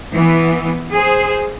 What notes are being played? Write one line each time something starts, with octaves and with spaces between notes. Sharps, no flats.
E3 B3
G#4 C5